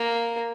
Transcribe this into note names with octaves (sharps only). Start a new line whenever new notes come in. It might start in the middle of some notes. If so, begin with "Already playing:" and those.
Already playing: A#3